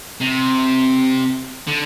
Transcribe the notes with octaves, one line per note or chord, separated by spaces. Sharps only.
C3
D3